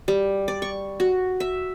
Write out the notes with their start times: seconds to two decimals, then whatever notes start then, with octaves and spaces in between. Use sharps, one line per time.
0.08 G3
0.48 D5
0.62 C#6
1.00 F#4
1.40 E5